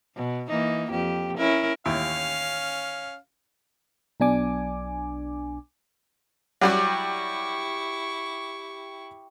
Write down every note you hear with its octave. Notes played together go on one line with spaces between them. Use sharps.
B2
E3 A#3 D#4
F2 G4
C#4 E4 A#4
A1 D#2 C#4 E4 F5
B1 B2 D4 G#5 D6
F#3 G3 E4 F#4 G4 C#6